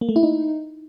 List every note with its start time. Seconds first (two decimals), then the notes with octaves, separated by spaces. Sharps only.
0.01 A#3
0.09 A3
0.16 E4
0.23 D#4